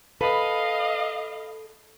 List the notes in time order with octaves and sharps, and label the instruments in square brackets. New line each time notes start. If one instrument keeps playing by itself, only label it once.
[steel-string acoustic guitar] A4 [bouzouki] B4 [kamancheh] D#5 F5